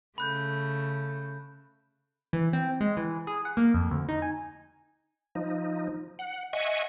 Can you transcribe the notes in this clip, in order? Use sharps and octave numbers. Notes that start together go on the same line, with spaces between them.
C#3 A3 B5 F#6 G6
E3
C4
G#3
E3
G#4
F#5
A#3
F2
D2
D#4
G#5
F3 D#4
F#5
D#5 E5 F#5 G#5 C#6